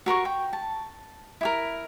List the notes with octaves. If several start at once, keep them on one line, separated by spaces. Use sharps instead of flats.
F#4 A#4 C6 C#6
G5
A5
E4 G4 A#4